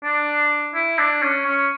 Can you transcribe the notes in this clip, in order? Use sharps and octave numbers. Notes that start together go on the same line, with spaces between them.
D4
E4
D4
C#4
C#4